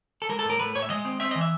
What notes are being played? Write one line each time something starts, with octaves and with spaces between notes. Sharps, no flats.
A4
G#3 A#4
A4
A2 A#4
A3 B4
A2 C#5
E5
G#3 D#5
C4
C4 E5
E3 D#5
E5